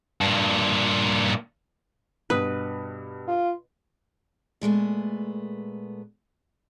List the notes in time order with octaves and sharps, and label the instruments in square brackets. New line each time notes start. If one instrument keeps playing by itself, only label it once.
[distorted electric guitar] G2 A#2
[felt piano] G2 B2 D#6 [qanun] B4
[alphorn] F4
[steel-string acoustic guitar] A#2 G#3 A3 B3